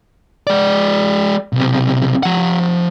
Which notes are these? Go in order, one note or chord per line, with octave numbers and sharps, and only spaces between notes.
G#3 D5
B1 C3
F3 F#5